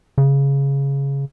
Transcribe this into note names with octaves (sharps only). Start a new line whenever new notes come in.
C#3